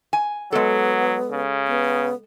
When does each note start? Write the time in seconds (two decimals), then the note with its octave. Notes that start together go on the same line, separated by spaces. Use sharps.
0.13 G#5
0.52 F#3 G#3 B3 A4
1.31 C#3
1.67 B3